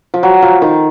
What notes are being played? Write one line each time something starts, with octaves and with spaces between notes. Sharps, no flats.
F3
F#3
F3
D#3